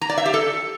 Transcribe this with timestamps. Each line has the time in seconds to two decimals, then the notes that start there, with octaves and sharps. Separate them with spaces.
0.01 A#5
0.10 D5
0.18 E5
0.26 G4
0.34 A4